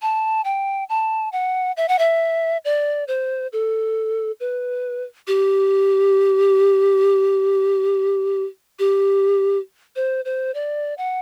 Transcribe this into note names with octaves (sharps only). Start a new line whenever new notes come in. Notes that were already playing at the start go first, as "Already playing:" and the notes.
A5
G5
A5
F#5
E5
F#5
E5
D5
C5
A4
B4
G4
G4
C5
C5
D5
F#5